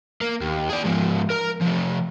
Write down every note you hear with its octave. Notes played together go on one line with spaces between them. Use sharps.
A#3
D#2
G#4 D5
G#2 F3
A#4 A#5
F3 A3